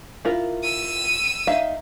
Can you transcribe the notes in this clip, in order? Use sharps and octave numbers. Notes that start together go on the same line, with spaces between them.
E4 F4 A#4
E6 D#7
D#4 E5 F5